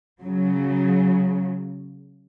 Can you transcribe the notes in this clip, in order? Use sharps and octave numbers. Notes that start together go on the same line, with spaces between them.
C#3 F#3